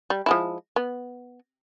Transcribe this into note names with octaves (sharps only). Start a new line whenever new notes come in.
G3
F3 G#3 E4
B3